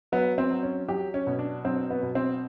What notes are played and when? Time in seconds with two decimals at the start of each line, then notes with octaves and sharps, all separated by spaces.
0.12 F#3 B3
0.38 C4
0.51 F#3
0.63 C#4
0.88 F#3 G4
1.14 C#4
1.27 B2
1.39 D4
1.64 F#3 C4
1.90 B3
2.03 B2
2.15 C4